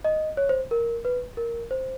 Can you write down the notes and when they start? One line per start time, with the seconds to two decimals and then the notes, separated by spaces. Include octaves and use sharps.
0.05 D#5
0.37 C#5
0.49 C5
0.71 A#4
1.05 B4
1.37 A#4
1.71 C5